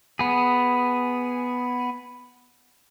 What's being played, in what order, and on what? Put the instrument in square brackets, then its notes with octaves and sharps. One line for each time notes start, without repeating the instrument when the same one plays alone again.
[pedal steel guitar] B3 G#4